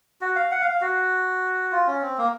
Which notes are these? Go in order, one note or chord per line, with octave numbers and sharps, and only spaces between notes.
F#4
F5
F#5
F5
F5
F#4
F4
C#4
C4
A#3